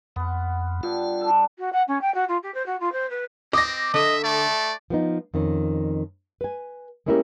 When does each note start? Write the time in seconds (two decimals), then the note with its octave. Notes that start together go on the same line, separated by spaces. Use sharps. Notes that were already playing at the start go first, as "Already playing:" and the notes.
0.16 F2 B3 F#5
0.83 G2 F4
1.21 D4 A4
1.58 F#4
1.73 F#5
1.88 C#4
2.01 G5
2.14 F#4
2.28 F4
2.43 G4
2.54 C5
2.66 F#4
2.80 F4
2.92 C5
3.10 B4
3.53 C4 D#5 D6 A#6
3.94 D3 D#5 E5
4.23 A3 D5
4.90 F3 B3 D#4
5.34 F2 D#3 C#4
6.41 B4 G#5
7.06 G#3 A#3 C#4 E4 G4 A#4